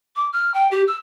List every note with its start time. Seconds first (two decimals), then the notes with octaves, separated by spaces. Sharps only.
0.16 D6
0.33 F6
0.54 G5
0.71 G4
0.88 E6